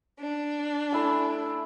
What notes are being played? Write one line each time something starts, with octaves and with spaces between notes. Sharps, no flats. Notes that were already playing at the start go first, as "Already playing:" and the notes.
D4
A3 E4 G#5